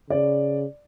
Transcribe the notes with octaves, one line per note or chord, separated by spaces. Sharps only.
C#3 D5